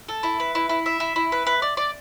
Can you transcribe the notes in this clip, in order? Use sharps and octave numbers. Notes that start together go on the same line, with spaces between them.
A4
E4
B4
E4
E4
E5
E4
E4
B4
B4
D5
D5